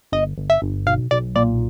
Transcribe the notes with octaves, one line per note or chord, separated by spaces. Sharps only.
G1 D#5
G1
E5
G1
B1 F5
B1 D5
A#2 D5